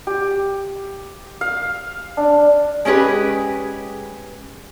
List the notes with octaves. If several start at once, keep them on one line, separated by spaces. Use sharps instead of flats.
G4
F5
D4
G#3 C#4 G4 G#4 B4